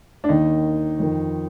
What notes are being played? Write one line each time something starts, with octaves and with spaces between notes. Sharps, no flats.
D4
D#2 D#3 D#4
F2 D#3